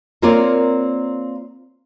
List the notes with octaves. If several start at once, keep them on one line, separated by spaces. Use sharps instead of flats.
A#3 C4 F4 A#4 C#5 D5